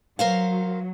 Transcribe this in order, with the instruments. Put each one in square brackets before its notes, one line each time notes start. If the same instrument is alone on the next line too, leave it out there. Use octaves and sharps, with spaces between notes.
[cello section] F#3 [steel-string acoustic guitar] A#4 C5 F5